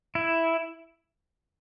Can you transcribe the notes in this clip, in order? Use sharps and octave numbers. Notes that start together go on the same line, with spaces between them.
E4